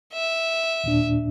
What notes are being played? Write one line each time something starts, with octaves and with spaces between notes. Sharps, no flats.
E5
D#2 A#2 D4